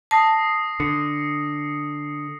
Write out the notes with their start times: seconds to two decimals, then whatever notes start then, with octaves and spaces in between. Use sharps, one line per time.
0.11 A5 D#6 A#6 C7
0.80 D3 C#7